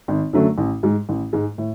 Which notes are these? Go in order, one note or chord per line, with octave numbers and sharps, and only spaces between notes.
G#1
F#2 D3 F#3 A3
A1
G#2 G#3
A1
G#2 G#3
A2